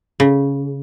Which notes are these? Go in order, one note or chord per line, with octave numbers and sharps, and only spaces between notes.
C#3